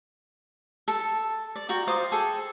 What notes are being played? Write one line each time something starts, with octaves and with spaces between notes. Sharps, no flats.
A4
D5
F#4 A#4 G5
F4 C5 D6 D#6
G#4 A4 G5